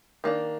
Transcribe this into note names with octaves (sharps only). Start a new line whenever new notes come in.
D#3 A#3 D4